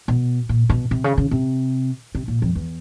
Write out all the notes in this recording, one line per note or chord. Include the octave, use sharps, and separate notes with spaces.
B2
A#2
B2
C3
C#3
C#3
C3
C3
A#2
F2
E2